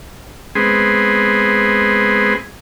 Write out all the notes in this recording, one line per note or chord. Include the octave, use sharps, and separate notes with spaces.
G#3 B3 C4 G#4